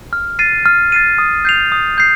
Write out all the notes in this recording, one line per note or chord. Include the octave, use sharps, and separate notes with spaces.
F6
A6 C7 D#7
F6
A6 C7 D#7
D#6
G6 C7 F7
D#6
G6 C7